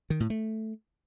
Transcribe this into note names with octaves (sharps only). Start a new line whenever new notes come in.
D#3
A2
A3